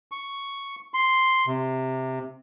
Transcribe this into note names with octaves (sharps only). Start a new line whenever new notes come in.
C#6
C6
C3